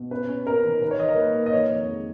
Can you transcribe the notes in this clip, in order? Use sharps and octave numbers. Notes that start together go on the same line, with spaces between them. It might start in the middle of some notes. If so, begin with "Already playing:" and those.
Already playing: B2
C#4 B4
C#4
C#4 A#4
D#3
D#3 B4
C#5
D#3 D#5
A#4
A#3 B4
A#3
D#5
D#3 C#5
F2
G#3